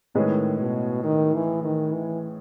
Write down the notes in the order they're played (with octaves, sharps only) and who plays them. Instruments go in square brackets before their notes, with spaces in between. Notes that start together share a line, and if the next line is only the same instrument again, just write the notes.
[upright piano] A2 G#3 C#4 G#4 B4 [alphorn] D#3
[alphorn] B2
D#3
E3
D#3
E3